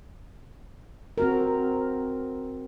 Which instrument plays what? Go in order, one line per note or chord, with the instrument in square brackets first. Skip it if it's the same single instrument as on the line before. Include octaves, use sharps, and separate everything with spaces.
[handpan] C4 F#4 A#4